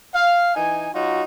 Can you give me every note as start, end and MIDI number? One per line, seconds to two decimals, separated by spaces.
0.15 0.53 77
0.56 0.88 52
0.56 0.88 63
0.56 0.88 80
0.93 1.22 54
0.93 1.22 63
0.93 1.22 65
0.93 1.22 66